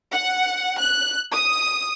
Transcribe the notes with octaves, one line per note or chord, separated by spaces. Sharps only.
F#5
F#6
D#6